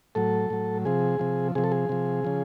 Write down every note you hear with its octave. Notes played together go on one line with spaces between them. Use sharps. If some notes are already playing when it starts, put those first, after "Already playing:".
A2 F#3 A4
A2 F#3
C3 F3 G#4
C3 F3
C3 F3 G#4
A4
G#4
C3 F3
C#3 F3